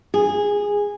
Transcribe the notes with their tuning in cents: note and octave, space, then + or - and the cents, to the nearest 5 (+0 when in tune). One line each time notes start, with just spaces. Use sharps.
G#4 -15